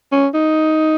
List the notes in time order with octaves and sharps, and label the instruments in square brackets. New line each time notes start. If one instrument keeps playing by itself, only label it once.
[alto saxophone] C#4
D#4